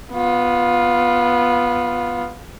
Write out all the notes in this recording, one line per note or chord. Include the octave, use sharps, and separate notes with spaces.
B3 F4